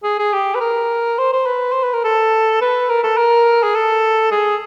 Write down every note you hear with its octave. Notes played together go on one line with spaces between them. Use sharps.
G#4
G#4
G4
B4
A#4
C5
C5
B4
C5
B4
A#4
A4
B4
A#4
A4
A#4
G#4
A4
G#4